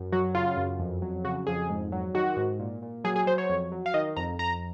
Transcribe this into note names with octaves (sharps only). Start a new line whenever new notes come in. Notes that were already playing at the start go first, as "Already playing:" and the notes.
Already playing: F#2
F#3 F#4
C#3 F4
F#2
F2
F#3
C#3 F#4
F2 G#4
G#2
F#3
D#3 F#4
G#2
A#2
A#2
F#3 G#4
G#4
F#3 C5
C#5
F2
F#3
F5
D#3 D#5
F2 A#5
F2 A#5